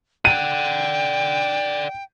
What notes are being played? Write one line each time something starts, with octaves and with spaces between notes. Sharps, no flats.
D5 F#5 G5 D#7